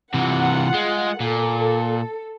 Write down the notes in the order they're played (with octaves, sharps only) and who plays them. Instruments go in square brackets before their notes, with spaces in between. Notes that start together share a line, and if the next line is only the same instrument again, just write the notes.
[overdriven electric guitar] C3 E3 [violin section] F4 F#5
[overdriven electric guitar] G#3
[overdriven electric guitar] A#2 [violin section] A4